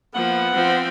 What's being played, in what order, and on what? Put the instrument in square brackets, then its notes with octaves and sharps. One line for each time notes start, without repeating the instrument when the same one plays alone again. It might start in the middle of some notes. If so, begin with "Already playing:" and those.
[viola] F3 A#3 [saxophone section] B3 F#5
[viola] F3 C4